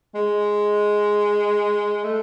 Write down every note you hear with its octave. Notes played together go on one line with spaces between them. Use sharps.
G#3
A3